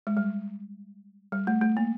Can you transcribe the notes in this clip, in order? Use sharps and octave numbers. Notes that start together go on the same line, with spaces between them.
G#3
G3
G3
A3
A3
A#3